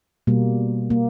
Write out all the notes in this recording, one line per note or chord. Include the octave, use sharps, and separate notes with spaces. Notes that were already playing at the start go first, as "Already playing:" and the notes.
B2 G3 A#3
A#3